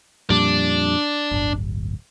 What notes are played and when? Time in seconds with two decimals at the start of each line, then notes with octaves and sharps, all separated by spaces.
0.30 F2 A#2 G3 D4
1.32 D1 G1